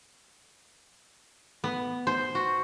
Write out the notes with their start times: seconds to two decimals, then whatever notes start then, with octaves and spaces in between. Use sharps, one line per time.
1.64 B3
2.07 C5
2.35 F#4